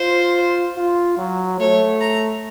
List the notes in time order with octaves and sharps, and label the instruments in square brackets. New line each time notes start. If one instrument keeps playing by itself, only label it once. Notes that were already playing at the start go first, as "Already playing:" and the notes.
Already playing: [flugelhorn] F4 [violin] C5
[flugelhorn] F4
F#3
[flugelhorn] A3 [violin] C#5
[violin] A#5